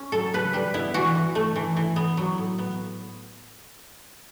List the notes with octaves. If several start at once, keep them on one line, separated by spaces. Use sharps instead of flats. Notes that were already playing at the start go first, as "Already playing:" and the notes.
Already playing: C#4
F#3 A4
C#3 B4
G3 B4
B3 E4
E3 F#4
E3
A3
E3
E3
B3
F#3
A2
B3